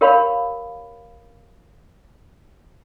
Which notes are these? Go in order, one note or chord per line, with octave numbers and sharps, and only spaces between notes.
G4 A#4 C#5 F5 B5